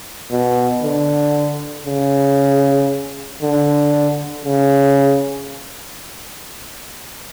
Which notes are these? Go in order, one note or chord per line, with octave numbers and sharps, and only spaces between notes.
B2
D3
C#3
D3
C#3